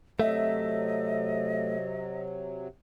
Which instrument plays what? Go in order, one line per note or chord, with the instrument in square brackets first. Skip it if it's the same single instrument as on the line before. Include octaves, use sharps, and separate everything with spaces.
[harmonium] C3 F#3 [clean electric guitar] A3 [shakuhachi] D#5 [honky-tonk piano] E5